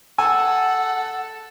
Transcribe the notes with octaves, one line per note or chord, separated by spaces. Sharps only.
A4 F#5 G#5 E6